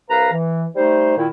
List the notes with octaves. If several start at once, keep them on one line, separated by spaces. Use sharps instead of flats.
C2 B4 F5 A#5
E3
G3 A3 D#4 C5
A#2 D#3 E4